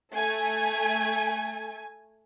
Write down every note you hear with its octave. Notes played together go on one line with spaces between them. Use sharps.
A3 G#5